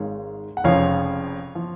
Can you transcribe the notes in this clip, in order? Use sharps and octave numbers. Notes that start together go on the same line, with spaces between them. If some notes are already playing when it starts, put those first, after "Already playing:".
Already playing: G#1 G#2 D#3 G#3 C#5 F5
F#5
F1 F2 C#3 F3 C#5 F5
F3